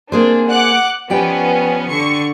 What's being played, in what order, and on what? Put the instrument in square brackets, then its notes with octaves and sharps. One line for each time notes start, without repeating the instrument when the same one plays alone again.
[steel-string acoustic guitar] A#3 G#4 C5 [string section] C4 D4
[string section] F#5 D6 F#6
[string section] F3 B3 C#4 [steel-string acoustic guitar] G4 D5 G5
[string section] D3 C#6 C#7